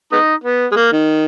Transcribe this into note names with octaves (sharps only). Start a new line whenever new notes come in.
G#3 B3 D#4
B3
G#3
A#3
D#3